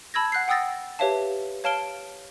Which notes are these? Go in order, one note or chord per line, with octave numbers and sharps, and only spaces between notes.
A5 B5 E6 G#6 A#6
F#5 F#6 G6 C7
F#5 G5 D#6 E6 A6 A#6
G4 B4 C#5 E5 F5 A5
C#5 F5 A5 F6 D7 G7